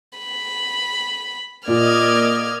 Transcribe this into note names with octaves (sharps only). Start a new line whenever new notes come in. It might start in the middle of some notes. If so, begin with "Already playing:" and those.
B5
A#2 A#3 D5 D#5 F6 G#6